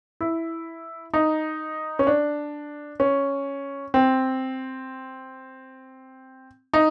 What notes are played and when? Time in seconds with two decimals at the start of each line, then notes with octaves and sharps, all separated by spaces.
0.21 E4
1.14 D#4
1.99 C#4
2.07 D4
3.00 C#4
3.94 C4
6.74 D#4